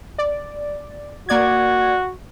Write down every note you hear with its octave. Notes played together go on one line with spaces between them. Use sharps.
D5
A#3 F#4 D5 G#6